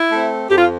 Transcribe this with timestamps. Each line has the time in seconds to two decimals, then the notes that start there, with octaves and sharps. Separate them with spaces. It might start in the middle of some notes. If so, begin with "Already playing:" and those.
Already playing: E4
0.12 A3 C4
0.50 F2 G4
0.58 F4